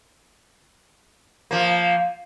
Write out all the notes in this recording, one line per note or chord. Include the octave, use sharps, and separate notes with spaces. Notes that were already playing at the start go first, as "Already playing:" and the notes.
F3 A#3